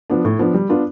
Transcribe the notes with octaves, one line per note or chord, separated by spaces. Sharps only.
F3 B3 D4
A2
F3 B3 D4
G3
B3 D4 F4